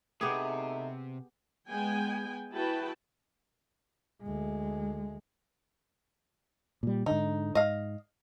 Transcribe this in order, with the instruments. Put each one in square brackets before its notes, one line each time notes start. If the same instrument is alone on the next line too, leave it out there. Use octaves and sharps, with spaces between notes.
[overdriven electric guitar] C3 [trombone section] A3 D#4 E4 [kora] B3 G4 G#4
[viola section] G#3 B3 G5 G#5
E4 F#4 G#4 B4 G5 A5
[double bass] D2 G#3
[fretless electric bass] A#2 G3
[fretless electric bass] G#2 D3 [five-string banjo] D#4
[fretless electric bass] G#2 [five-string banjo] D#5 F5